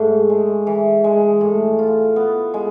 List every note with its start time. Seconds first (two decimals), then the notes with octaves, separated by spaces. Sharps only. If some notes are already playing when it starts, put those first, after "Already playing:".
Already playing: G#2 A3
0.30 G#3
0.67 E3
1.04 G#3
1.41 A2
1.79 F4
2.16 B3
2.54 G#3